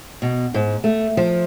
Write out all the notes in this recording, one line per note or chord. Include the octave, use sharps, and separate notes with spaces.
B2
G#2
A3
F3